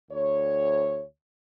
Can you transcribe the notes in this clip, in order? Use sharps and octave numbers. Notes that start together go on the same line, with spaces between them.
D2 C#5